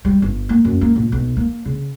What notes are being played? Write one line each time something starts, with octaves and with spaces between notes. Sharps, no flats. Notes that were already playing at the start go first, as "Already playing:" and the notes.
G3
G1
A#3
F#2
A#3
A#1
B1
A#3
C#3